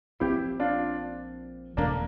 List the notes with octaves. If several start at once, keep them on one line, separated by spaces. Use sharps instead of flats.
A#1 A#2 F3 C4 E4 G4
D4 F4
E1 E2 D3 A3 A#3 D4